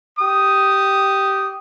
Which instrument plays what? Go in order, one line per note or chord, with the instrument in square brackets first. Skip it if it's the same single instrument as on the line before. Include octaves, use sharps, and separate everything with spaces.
[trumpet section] G4 D#6